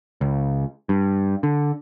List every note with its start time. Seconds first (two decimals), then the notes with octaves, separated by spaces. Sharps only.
0.21 C#2
0.89 G2
1.43 D3